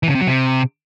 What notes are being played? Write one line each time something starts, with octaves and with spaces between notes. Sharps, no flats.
E3
C#3
C3
F#3
C3